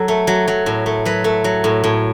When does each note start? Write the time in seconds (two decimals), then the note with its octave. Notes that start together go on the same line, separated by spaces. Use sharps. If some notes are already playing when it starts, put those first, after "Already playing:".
Already playing: F#3 A4
0.08 A3
0.27 F#3
0.48 F#3
0.66 A2
0.86 A3
1.05 F#3 B4
1.24 A3
1.44 F#3
1.64 A2
1.84 A2